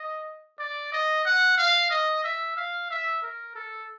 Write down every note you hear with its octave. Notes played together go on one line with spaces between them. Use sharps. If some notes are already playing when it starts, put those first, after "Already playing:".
Already playing: D#5
D5
D#5
F#5
F5
D#5
E5
F5
E5
A#4
A4